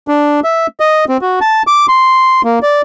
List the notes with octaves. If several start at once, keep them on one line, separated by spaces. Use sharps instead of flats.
D4
E5
D#5
C4
F#4
A5
D6
C6
A#3
D5